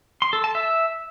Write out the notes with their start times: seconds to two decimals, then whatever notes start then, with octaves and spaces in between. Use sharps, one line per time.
0.22 C6
0.33 A4
0.44 A5
0.55 E5